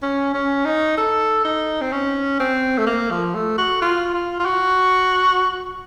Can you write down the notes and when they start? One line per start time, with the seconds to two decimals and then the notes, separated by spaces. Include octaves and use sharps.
0.03 C#4
0.34 C#4
0.65 D#4
0.97 A4
1.44 D#4
1.81 C4
1.92 C#4
2.40 C4
2.78 A3
2.86 A#3
3.11 F3
3.35 A3
3.58 F#4
3.82 F4
4.14 F4
4.40 F4
4.45 F#4